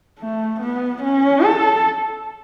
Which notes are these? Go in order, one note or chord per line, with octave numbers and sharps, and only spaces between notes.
A3
B3
C#4
A4